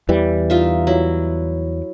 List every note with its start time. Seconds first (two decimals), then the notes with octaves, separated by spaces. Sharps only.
0.09 E2 E3 G3
0.50 D#4 F4 E5
0.87 F#3 E4